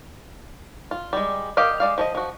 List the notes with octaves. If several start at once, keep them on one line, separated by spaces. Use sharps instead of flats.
F4
G3 G#3
G4 A#4 D#5 F5 F#5
G#3 D5 F5
F3 A4 D#5
F3 F#4